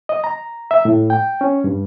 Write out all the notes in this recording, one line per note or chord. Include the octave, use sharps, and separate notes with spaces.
D#5
A#5
E5
A2
G5
C#4
G2